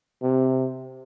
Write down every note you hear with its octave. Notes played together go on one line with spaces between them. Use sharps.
C3